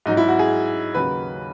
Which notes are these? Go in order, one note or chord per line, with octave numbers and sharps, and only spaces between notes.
G#2 F#3 D#4
E4
F#4
G#4
D#2 C#3 F#3 B4